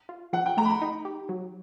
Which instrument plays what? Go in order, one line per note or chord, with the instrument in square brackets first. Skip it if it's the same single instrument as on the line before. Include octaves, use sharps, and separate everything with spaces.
[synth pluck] F4
[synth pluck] F3 [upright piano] F#5
[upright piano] G5
[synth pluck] A3 [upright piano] A#5
[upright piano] B5
A#5
[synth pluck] D#4
G4
F#3